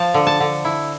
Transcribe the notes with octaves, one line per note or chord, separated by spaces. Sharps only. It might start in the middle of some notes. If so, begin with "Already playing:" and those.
Already playing: F3 A5
D3
A5
D3
E4